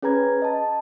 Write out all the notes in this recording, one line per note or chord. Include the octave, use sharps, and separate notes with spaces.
C#4 G#4 B4 A#5 G#6
D#5 A5